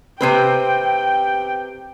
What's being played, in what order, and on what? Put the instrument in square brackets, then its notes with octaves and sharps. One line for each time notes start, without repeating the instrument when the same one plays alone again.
[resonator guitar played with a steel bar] C3 C4 B4 [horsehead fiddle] G5